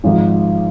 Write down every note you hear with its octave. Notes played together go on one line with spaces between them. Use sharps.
G#1 G#2 F3